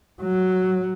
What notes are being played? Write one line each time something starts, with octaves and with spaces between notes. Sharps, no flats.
F#3